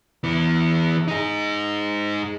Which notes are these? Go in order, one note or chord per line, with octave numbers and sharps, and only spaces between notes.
E3 B3
D#4 G#4